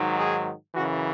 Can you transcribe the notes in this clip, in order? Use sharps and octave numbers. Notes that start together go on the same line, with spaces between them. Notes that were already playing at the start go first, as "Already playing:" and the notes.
Already playing: G#2 D#3 F#3
G#4
F#2 C#3 E3 F#4